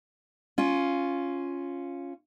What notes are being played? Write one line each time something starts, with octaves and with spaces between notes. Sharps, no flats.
C#4 F4